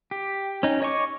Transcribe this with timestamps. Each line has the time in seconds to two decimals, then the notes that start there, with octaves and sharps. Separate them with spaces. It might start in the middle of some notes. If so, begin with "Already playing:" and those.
0.11 G4
0.63 C#4 D#4
0.82 C#5 D#5 G#5 C#6 D6